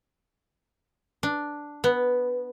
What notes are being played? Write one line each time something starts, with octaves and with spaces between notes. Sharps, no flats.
D4
B3